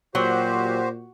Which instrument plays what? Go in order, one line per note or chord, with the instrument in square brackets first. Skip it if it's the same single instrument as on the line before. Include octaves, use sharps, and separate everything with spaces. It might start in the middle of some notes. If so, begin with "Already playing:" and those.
[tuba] A#2 [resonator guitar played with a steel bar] F#3 [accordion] F#4 G4 C5